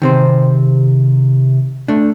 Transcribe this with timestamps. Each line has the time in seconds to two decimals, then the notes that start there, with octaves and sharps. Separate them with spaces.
0.02 C3 D#3 C4 C5
1.88 A3 D4